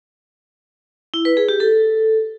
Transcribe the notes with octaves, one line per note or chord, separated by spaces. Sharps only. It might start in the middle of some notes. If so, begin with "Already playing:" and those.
E4
B4
G#4
G4
A4